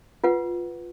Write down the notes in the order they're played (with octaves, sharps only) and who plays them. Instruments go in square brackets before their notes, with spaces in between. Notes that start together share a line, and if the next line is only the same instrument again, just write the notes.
[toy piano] F4 B4 F#5